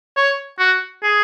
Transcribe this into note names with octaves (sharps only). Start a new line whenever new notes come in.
C#5
F#4
G#4